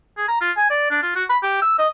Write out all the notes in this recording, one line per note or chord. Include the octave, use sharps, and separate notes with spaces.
G#4
A#5
F4
G#5
D5
D4
F4
F#4
B5
G4
E6
D#5